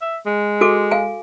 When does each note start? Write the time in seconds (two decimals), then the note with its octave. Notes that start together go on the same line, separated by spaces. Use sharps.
0.01 E5
0.26 G#3
0.61 F#4 A4 D6
0.91 F5 G#5